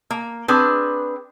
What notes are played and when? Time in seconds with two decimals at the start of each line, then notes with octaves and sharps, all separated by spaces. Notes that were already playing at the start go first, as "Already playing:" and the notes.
0.10 A#3
0.48 C4 D4 G#4 B4